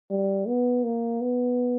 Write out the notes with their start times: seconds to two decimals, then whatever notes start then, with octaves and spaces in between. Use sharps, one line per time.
0.10 G3
0.47 B3
0.84 A#3
1.21 B3